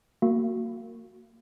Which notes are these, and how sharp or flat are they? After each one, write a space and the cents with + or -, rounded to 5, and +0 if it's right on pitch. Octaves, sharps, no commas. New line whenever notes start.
A#3 -20 F#4 -10